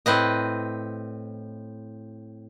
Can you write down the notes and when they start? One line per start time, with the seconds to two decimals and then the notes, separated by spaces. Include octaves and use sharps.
0.06 A2 C4 B4 D#5